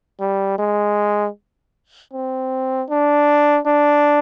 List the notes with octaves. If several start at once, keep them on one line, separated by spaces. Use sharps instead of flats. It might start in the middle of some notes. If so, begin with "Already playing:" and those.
G3
G#3
C4
D4
D4